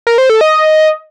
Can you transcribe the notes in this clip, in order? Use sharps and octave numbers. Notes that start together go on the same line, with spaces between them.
A#4
C5
A4
D#5